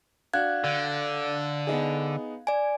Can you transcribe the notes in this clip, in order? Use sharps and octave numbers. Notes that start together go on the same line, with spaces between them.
D4 F#4 F5 F#6 G#6
D3
B3 D#4 G#4
D5 G#5